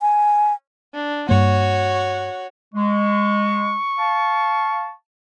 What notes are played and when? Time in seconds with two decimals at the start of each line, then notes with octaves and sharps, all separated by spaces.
0.02 G#5
0.94 D4
1.29 G2 A#3 F#4 C#5
2.75 G#3 C#6
3.98 F5 A5